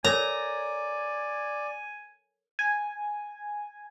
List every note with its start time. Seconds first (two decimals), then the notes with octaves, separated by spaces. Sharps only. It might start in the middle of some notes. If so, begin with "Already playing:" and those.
0.04 A4 A#4 C#5 D5 G#5 A#5
2.59 G#5